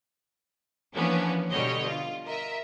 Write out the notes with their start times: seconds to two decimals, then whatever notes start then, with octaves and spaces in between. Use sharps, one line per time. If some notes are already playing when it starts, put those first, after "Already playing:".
0.96 E3 F3 A#3 B3 C#4 D4
1.51 B2 D3 G3 C#5 D#5
1.87 F4
2.25 A#4 D#5 E5